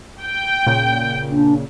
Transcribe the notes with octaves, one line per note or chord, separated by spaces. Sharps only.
G5
A#2 C#3
D4